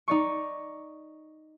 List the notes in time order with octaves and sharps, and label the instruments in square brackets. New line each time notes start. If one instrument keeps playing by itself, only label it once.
[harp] D#4 D5 C#6